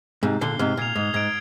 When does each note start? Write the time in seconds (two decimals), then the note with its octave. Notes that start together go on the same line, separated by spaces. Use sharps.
0.23 G#2 C3 G6
0.41 A#2 D3 C7 G7
0.59 G#2 C3 F6
0.77 A#2 G#6 C7 F7
0.96 G#2 D#6
1.14 G#2 G#6 D7